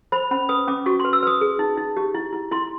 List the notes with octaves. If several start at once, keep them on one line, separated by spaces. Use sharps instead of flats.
C5 B5
C#4 B5
B4 D#6
C#4 D6
F#4 C#6
C6
B4
E6
B4 D#6
G#4
D#4
D#4
G4
E4
E4
E4 C6